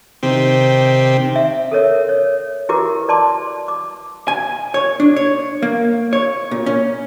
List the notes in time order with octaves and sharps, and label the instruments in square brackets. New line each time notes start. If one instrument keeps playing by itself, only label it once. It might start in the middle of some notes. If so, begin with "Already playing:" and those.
[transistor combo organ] C3 D#3 C4 G4
[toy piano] E5
A4 A#4 C#5 E5
C#5
E4 F#4 G4 A#4 B4 D6
D5 A5 C6 D6
D6
[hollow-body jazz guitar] G#5
C#5
D4
C#5
A#3
C#5
A#2
C#4